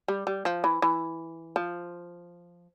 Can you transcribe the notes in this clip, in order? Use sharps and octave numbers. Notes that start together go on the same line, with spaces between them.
G3
G3
F3
E3
E3
F3